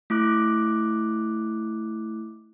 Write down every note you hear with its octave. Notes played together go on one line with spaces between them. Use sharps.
A3 E4 D6 F#6